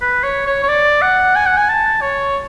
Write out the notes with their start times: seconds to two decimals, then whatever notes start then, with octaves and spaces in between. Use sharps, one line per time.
0.02 B4
0.23 C#5
0.47 C#5
0.63 C#5
0.69 D5
1.02 F#5
1.36 G#5
1.46 F#5
1.57 G#5
1.69 A5
2.01 C#5